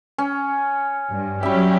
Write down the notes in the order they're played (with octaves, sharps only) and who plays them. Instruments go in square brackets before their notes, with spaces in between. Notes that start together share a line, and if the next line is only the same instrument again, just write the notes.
[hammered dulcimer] C#4
[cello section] G2
[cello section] F#3 C#4 G4 [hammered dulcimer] G3 E5